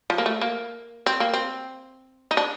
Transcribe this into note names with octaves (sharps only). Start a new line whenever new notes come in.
F3
A#3
A3
A#3
C4
A#3
C4
D#4
D4